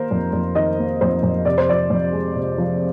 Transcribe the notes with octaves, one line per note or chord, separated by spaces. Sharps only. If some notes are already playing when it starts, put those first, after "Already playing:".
Already playing: D#3 A#3 A#4 C5
F2
F2
D#3 D#5
A#3
F2 C5
F2
C3 D5
C5
F3 D5
F2
G#3
C3
F3